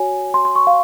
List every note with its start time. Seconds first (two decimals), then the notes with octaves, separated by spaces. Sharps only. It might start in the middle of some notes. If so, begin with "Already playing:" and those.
Already playing: F#4 C#5 G#5
0.34 C6
0.45 C6
0.56 C#6
0.67 F5